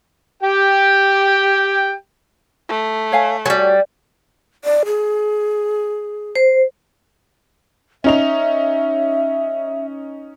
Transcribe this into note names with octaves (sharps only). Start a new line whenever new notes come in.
G4 G5
A3
C#5 F5 G#5
F#3 G3 F#4 C#5 G#5
D5
G#4
C5
C#4 D#4 E5 F7